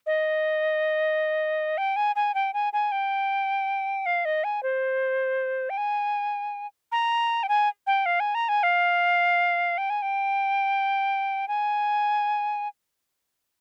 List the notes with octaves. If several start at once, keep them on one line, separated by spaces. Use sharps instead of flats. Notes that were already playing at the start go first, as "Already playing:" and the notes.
D#5
G5
G#5
G#5
G5
G#5
G#5
G5
F5
D#5
G#5
C5
G5
G#5
A#5
G5
G#5
G5
F5
G#5
A#5
G#5
F5
G5
G#5
G5
G#5